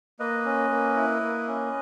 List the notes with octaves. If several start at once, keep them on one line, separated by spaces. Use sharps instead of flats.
A#3 B4 D#5
C#4
A#3
E4
A#3
C#4